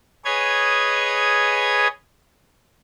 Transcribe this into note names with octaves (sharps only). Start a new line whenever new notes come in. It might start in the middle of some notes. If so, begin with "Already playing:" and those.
G#4 B4 C#5 D#5 G#6